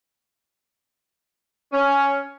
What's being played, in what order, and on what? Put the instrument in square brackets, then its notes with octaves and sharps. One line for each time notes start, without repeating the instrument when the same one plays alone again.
[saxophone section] C#4